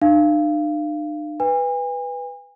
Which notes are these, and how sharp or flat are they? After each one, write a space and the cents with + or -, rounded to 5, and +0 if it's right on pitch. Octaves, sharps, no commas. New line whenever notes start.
D4 +45 F5 -20
B4 +0 G#5 -40